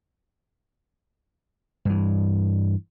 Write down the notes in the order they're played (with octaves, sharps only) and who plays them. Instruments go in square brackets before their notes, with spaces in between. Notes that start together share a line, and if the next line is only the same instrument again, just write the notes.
[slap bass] G2 E3